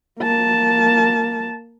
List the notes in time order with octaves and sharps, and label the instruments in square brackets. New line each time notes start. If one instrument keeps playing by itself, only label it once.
[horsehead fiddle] A#3 A5